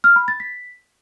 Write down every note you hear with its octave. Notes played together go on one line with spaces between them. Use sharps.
F6
B5
A6
B6